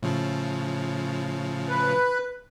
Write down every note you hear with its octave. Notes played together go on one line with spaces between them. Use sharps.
A2 C#3 F3
B4